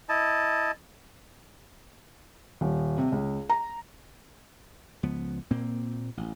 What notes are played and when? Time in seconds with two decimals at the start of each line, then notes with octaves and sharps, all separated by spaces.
0.09 E4 D#5 A5
2.61 D#1
2.98 C3
3.12 C#2
3.50 A#5
5.03 C#2 F3 B3
5.51 A#2 A#3 C4
6.17 A1